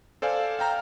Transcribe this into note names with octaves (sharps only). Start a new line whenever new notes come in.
A4 C5 D5 F5 G#5
F5 G5 A#5 F6